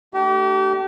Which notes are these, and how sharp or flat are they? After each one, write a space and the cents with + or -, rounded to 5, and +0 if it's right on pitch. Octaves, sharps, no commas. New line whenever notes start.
A3 +0 D4 +0 G4 -35